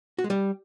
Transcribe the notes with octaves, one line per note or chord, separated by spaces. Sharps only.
F#4
G#3
G3